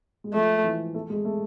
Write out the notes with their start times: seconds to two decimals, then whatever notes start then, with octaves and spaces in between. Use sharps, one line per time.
0.24 G#3
0.34 F3 A3
0.64 E3
0.94 A3
1.10 G#3
1.25 A3